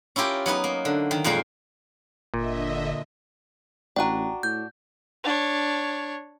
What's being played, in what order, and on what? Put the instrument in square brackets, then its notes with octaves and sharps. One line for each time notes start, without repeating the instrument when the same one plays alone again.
[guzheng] C#4 E4 F4 G4 A#4
F#3 B3 D#4 B4
A#3
D3
D#3
F2 A#2 G#3 A#3 A#4
[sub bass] G1 [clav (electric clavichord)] A#2 [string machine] D3 D#5 E5
[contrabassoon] A1 [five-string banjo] D4 F#4 D5 [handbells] G5 A#5
[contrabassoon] A2 [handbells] G6
[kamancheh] D4 C#5